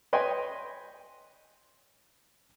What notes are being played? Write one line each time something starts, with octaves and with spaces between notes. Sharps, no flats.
B4 C#5 D#5 G5 G#5 C6